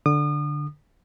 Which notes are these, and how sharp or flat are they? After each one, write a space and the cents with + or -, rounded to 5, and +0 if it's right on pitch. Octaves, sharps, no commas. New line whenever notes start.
D3 +0 D#6 -35